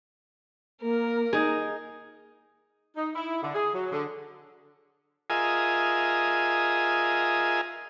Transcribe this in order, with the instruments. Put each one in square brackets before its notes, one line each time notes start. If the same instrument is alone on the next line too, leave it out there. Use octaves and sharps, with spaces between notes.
[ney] A#3 [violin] A#4
[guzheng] D#4 [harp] G#4
[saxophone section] D#4
E4
D3
G#4
F#3
D3
[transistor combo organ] F4 G#4 A#4 D#5 E5 G#5